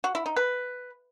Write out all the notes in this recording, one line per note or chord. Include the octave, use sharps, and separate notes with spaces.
F#4
E4
D#4
B4